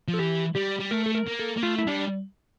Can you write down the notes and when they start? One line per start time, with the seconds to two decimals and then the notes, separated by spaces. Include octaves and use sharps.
0.08 F3
0.14 A4
0.19 E3 G4
0.55 G3 G4
0.79 G3
0.91 A3 A#4
1.06 A4
1.15 A#4
1.27 A#3
1.39 A4
1.56 A#3
1.62 A3 F4
1.78 E4
1.87 G3 D4